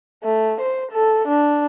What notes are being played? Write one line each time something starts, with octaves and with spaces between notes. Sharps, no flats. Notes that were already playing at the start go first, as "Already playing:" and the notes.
A3
C5
A4
D4